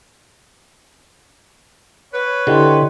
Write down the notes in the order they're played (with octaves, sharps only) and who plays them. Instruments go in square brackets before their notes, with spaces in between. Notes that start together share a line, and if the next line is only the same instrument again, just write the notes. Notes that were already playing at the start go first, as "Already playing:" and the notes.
[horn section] B4 C#5
[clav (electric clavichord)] D3 [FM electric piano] E4 G4 [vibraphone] D#5 G5 C6